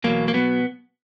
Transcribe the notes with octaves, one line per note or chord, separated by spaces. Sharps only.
E2 B2 F#3 A#3
A#3
B2 F#3 B3